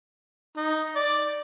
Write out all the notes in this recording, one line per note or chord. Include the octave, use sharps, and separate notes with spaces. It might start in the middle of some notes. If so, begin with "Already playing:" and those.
D#4
D5